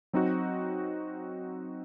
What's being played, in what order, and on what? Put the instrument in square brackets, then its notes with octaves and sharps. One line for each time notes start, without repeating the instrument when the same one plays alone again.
[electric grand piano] F#3 C4 D#4 F#4